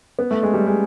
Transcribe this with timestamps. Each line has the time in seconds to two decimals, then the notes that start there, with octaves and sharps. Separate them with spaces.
0.19 B3
0.31 A3
0.43 G#3
0.54 G3
0.67 G#3